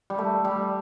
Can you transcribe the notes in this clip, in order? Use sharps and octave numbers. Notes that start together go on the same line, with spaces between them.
G3
A3
G3